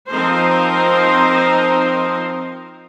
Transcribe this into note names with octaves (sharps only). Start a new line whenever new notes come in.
F3 C4 D#4 A#4 C5